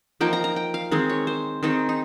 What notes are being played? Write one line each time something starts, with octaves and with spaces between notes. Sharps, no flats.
F3 A#3 D#4 G5
A#5
A#5
G5
F5
D#3 G#3 C4
C#5
C5
D#3 G#3 C4 D#4
D#4